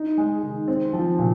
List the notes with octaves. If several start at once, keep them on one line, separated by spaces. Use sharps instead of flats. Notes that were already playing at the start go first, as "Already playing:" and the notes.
Already playing: D#4
G#3
D#3
C4
F3
A#2